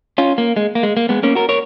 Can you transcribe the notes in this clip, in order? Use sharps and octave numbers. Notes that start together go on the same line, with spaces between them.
C#4 F4
A#3
G#3
A#3
G#3
A#3
G#3 B3
A#3 C#4
F#4 A#4
A#4 C#5